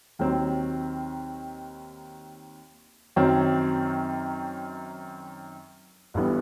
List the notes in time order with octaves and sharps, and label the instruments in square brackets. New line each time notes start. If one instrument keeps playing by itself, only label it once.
[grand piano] D#2 D#3 F#3 C4
F#2 D#3 F#3 C4
G1 G2 E3 G3 B3